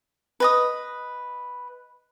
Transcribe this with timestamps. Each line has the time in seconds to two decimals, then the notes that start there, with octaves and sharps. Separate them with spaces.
0.40 B4 D#5 D#6